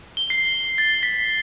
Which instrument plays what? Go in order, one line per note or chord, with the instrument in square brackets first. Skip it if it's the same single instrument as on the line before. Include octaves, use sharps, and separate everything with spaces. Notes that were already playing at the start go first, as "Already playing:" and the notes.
[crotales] G7
C7
A6
B6